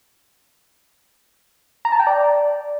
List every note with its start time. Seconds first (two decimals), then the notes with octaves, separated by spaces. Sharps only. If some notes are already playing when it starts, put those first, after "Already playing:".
1.85 A#5
1.92 A5
1.99 G5
2.07 D5